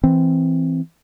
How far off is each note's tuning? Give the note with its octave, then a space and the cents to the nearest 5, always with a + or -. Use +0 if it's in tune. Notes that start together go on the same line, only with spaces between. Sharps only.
E3 +0 C4 +0